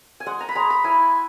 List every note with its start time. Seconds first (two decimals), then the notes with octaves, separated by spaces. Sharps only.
0.20 G#5
0.26 G#3 F#5
0.40 A#5
0.49 B5
0.55 G#3 A#5
0.70 B5
0.84 E4 G#5